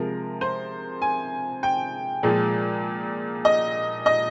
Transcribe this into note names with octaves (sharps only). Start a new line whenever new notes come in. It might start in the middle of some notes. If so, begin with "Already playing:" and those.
Already playing: C3 F3 G#3 A#4
C5
G#5
G5
A#2 F3 G#3
D#5
D#5